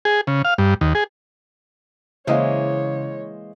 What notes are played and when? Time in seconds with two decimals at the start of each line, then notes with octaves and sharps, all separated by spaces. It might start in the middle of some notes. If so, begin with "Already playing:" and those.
0.05 G#4
0.27 C#3
0.45 F5
0.58 G2
0.81 D#2
0.95 G#4
2.27 C#3 E3 G#3 A#3 C5 C#5 D#5 F5